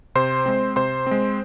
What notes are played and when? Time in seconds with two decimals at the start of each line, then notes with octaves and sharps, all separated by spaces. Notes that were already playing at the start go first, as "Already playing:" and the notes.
0.15 C3 C5 C6
0.46 G#3 C4
0.76 C3 C5 C6
1.07 G#3 C4